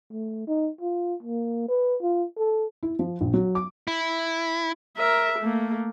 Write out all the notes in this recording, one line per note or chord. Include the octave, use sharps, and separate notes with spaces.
A3
D#4
F4
A#3
B4
F4
A4
E4
F3
A#1
F#3
D6
E4
A#4 E5
A3 A#3